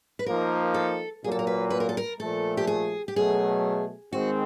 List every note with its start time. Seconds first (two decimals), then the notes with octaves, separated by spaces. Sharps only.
0.19 B4
0.26 F3 A#3 D#4 A#4
0.74 A4
1.23 A#2 F#3 A#3 G#4
1.31 A4
1.39 A#4
1.47 B4
1.70 B4
1.80 A#4
1.89 A4
1.97 A#4
2.20 A#2 F3 A3 A4
2.57 G4
2.67 G#4
3.08 G4
3.16 B2 F#3 A3 G#4
4.13 D#3 G#3 C4 F#4